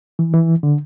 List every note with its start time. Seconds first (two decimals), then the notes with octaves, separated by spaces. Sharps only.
0.19 E3
0.34 E3
0.63 D3